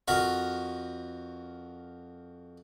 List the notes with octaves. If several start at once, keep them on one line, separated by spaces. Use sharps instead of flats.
F2 F#4 A#4 B5 C#6